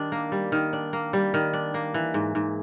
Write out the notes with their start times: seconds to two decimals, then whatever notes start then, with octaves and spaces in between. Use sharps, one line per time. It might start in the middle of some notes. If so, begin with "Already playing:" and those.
Already playing: D#3 G3 D4
0.12 A#3
0.32 G3
0.52 D#3
0.73 D4
0.93 A#3
1.13 G3
1.34 D#3
1.53 D4
1.74 A#3
1.94 E3
2.14 G#2
2.35 G#2